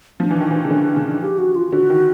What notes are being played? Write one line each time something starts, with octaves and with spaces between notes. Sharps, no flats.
F3 D4
E3
D#3
E3
C#3
D3 D4
C#3
G4
F#4
F4
D3 F#4
D#3